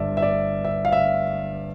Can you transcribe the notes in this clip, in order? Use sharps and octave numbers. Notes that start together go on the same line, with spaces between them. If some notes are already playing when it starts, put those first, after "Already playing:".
Already playing: G1 G2 D5 E5
E5
D5
E5
F5
E5